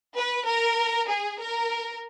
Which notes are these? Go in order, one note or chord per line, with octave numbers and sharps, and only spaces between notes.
B4
A#4
G#4
A#4